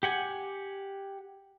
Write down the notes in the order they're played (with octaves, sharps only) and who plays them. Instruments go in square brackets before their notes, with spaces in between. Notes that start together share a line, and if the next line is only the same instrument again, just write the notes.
[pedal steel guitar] G4 F#5 G#5